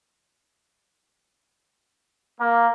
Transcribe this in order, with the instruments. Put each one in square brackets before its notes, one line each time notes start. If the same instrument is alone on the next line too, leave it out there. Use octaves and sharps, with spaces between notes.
[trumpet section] A#3